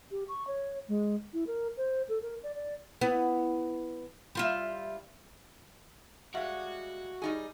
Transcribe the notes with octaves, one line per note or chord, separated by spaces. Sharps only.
G4
C#6
C#5
G#3
E4
A#4
C5
A4
A#4
D5
D5
B3 E4
G3 F4 E5
G3 G#3 F#4 E5 F5
G3 D#4 G#4